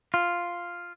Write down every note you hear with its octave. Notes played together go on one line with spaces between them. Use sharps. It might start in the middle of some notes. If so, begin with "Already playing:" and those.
F4